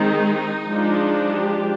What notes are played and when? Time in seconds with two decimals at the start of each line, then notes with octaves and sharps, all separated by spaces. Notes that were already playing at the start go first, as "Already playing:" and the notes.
Already playing: D#3 G#3 C4 D#4
0.68 F3 G#3 D4
1.30 G4